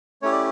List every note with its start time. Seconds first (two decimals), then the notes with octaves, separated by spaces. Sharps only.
0.22 A3 C#4 E4 G4 C#5
0.32 D5